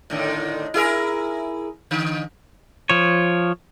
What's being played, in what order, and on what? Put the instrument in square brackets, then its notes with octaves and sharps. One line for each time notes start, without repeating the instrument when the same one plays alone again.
[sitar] A2 D3 D#3
E4 G#4 A#4
D3
[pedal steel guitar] F3 C#5